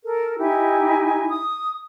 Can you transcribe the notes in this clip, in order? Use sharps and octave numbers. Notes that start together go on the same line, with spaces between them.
A4 A#4
D#4 E4 G4 G#5
D#6